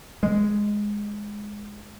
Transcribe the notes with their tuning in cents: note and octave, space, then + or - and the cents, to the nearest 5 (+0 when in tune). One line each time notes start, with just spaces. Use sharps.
G#3 -5